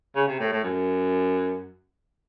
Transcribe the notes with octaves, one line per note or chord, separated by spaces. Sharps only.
C#3
C3
A2
A2
F#2